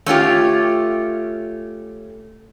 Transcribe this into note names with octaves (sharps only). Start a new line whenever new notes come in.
A3 C#4 F4 G4